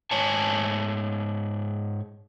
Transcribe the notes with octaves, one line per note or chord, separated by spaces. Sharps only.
G#2 C#5 G#5 A5